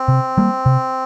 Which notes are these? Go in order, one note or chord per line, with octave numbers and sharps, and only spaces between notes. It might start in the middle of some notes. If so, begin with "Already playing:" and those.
Already playing: C4
C3
G3 A#3
C3